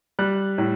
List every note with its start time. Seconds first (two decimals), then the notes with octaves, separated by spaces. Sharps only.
0.19 G3 F#6
0.58 A2